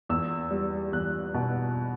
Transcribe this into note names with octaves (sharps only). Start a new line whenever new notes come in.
E2 E6
G3
E2 F#6
B2